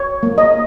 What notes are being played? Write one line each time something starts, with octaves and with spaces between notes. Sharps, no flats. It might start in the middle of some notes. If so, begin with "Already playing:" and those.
Already playing: C#5
A#3
D#5